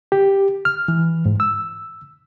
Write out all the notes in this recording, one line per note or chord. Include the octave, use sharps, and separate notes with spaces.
G4
F6
E3
G#2
E6